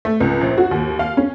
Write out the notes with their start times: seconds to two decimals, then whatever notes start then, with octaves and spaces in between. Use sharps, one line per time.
0.05 A3
0.20 C#2
0.41 A#1
0.58 F#4
0.71 D#2
0.99 F5
1.17 C#4